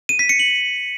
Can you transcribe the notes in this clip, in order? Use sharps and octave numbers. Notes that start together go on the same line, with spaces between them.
D#7
B6
C#7
F#7